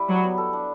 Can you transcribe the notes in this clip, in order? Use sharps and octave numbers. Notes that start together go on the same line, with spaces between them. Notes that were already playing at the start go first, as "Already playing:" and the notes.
Already playing: G3 E4
F#3 B4
B3
A4
D4